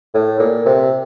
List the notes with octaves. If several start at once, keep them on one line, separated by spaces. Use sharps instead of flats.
A2
A#2
C3